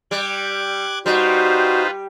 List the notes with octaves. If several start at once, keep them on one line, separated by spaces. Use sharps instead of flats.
G3 D6 F#6 G#6
G3 D#4 F4 F#4 B4 C5